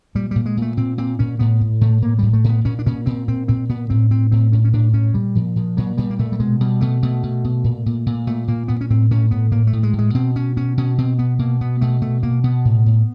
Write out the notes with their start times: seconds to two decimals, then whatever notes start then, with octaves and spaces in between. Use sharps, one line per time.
0.15 A#2 G3
0.31 A#2 G3
0.46 G#3
0.57 A#2 A3
0.77 A#2 C4
0.98 A#2 C4
1.19 A#2 C#4
1.39 A2 B3
1.61 A2
1.81 A2 A3
2.02 A2 A#3
2.19 A2 G3
2.33 A3
2.44 A2 B3
2.65 A#2 C#4
2.79 D4
2.86 A#2 C#4
3.06 A#2 C4
3.28 A#2 C4
3.48 A#2 C4
3.69 A#2 B3
3.90 A2 C4
4.10 A2 C4
4.31 A2 C4
4.52 A2 C#4
4.65 C#4
4.73 A2 D4
4.93 A2 C#4
5.14 A#2 G3
5.35 A#2 F3
5.56 A#2 F3
5.77 A#2 F#3
5.97 A#2 G3
6.10 A#3
6.19 A#2 A3
6.32 G3
6.40 B2 G#3
6.60 B2 G3
6.81 B2 A3
7.03 B2 A3
7.23 B2
7.44 B2
7.64 A#2
7.86 A#2
8.06 A#2
8.27 A#2 A3
8.48 A#2 A#3
8.68 A#2 B3
8.81 C#4
8.90 A2 C4
9.11 A2 C#4
9.31 A2 B3
9.51 A2 A#3
9.67 A3
9.73 A2
9.83 G#3
9.93 A2
9.99 G#3
10.14 B2 C4
10.36 B2 C#4
10.57 B2 C#4
10.77 B2 C#4
10.98 B2 C4
11.19 B2 B3
11.39 B2 A#3
11.61 B2 B3
11.81 B2 A3
12.01 B2 A3
12.23 B2 A#3
12.44 B2 B3
12.65 A2
12.86 A2